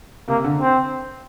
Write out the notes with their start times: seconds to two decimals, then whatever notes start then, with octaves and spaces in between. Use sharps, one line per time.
0.28 C3 A#3
0.44 D3
0.60 C4